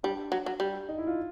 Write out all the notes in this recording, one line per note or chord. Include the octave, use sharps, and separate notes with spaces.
G3 D4
F#3
F#3
G3
D#4
E4
F4